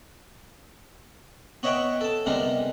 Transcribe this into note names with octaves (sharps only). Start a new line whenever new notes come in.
B3 C#5 D#5 E5 F#5 G5
A4 A5
C3 G3 G#3 B3 D#4 A#4